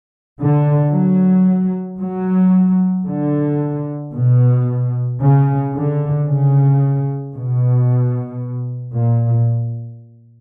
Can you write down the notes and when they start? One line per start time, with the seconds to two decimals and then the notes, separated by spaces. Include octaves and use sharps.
0.39 D3
0.93 F#3
2.00 F#3
3.06 D3
4.14 B2
5.20 C#3
5.74 D3
6.27 C#3
7.34 B2
8.94 A#2